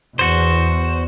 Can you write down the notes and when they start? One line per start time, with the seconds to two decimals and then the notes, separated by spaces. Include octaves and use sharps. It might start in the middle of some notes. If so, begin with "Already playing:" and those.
0.19 E2 F#4 C5